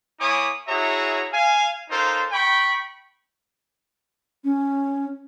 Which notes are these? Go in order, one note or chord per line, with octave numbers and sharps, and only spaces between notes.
A#3 E4 C#5 G#5 D6 D#6
E4 F#4 G#4 C#5 E5 A#5
F5 G#5
C#4 D#4 F4 A4 A#4 C5
G5 B5 C#6
C#4